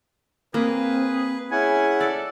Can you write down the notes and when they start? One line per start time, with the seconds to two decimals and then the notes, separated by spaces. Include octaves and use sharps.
0.54 A#3 C4 G#4 B4
1.51 C#4 E4 G#4 F#5 G#5
2.01 A4 D5